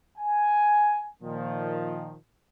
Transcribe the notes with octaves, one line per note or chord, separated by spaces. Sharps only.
G#5
A#2 D#3 F3